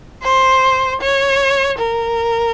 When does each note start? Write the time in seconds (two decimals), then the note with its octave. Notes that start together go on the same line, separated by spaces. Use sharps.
0.23 C5
1.01 C#5
1.78 A#4